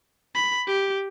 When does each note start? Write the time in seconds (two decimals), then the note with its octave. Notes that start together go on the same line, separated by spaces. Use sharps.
0.35 B5
0.67 G4